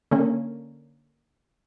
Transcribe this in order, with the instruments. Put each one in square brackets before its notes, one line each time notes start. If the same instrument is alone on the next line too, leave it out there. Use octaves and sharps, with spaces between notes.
[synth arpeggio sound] D3 A#3 C#4